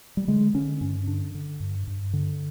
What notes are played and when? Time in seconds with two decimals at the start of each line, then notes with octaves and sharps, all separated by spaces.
0.17 G3
0.28 D3 G#3
0.54 D3 C#4
0.81 G2 C#4
1.07 D3 D4
1.35 D3
1.60 G2
1.87 G2
2.13 D3